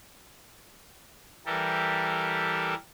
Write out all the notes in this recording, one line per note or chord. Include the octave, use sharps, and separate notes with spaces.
E3 G3 G4 A4 A#4